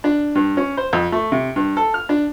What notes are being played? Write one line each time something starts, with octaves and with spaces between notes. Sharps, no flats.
D4
G2
C#4
C5
F2
A3
C3
G2
A4
F6
D4